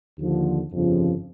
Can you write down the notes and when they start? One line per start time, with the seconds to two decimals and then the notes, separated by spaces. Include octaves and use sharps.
0.18 D#2 D3 F3
0.71 G1 F2 C#3 F3